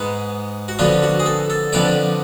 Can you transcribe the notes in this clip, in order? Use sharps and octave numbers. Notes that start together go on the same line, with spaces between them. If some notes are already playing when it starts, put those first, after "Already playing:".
Already playing: G#2 G#3 B3
F#4
F2 D3 F3 B3 D4 F4
F#4
G#4
A4
A4
F2 D3 F3 B3 D4 D5